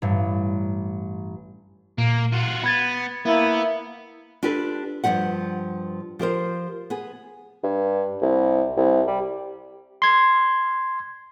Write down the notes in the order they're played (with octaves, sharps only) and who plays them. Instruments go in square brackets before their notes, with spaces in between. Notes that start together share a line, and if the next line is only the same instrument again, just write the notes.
[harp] A1 G2
[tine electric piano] A#2 [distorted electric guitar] A#3
[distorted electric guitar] F4 F#4
[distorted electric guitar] B3 [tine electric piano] B5 G#6 A6
[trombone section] A#3 E4 [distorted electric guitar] B3
[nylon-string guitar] D4 F4 G4 A4 B4
G2 C#3 F3 G4 F#5
F3 G4 A#4 C5
B3 G#4
[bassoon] G2
C2
C2
G3
[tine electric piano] C6 G#6